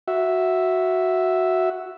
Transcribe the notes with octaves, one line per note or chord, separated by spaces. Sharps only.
F#4 E5